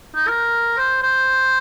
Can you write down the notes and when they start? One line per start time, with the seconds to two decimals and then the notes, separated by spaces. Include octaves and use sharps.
0.15 D#4
0.28 A#4
0.78 C5
1.03 C5